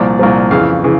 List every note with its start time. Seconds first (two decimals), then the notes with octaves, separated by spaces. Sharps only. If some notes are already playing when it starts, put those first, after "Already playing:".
Already playing: C2 A#2 F3 D5
0.19 C2 A#2 F3
0.51 F2 C#3 E3 F5
0.84 C#3 E3